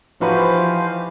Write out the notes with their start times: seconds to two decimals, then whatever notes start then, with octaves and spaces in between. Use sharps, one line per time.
0.21 E3 F3 D#4 F#4 G4 B4 C5 F5